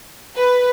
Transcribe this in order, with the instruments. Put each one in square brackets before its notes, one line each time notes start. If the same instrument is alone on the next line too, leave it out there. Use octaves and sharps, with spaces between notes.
[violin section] B4